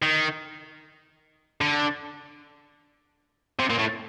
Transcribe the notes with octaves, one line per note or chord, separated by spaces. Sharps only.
D#3
D3
C3
A#2
A2